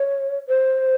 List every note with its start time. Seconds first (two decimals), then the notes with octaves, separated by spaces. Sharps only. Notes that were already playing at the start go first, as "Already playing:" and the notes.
Already playing: C#5
0.48 C5